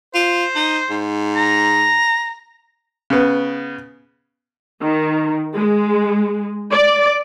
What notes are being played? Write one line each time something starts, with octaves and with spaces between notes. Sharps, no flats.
F4 C5
D#4
G#2
A#5
C#3 B3
D#3
G#3
D5